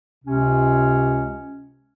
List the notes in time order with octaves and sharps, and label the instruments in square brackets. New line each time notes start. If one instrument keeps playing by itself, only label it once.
[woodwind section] C#2 C3 C#4